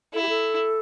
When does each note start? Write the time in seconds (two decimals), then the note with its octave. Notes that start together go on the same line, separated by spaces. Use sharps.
0.14 E4 A4
0.22 G4
0.29 A4